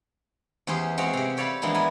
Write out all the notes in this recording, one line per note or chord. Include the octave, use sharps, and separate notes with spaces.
E2 C#4 G4 G#4 C5 C6
G#3 C4 F#4 G#4 C#5 F5
C3 G4
A4 C#5 D5 F5 A5 B5
E3 F3 G#3 A#3 B3 D4
B3 A#4 B4 G#5